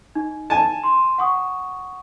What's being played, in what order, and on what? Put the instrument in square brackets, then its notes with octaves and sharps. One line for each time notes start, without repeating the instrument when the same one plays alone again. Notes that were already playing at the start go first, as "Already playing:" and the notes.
[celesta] D#4
[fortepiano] G#5 A5
[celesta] C6
F#5 C#6 D#6